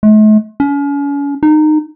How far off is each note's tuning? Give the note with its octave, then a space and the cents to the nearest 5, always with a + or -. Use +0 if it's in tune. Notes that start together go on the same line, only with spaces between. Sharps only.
A3 -45
C#4 +40
D#4 -20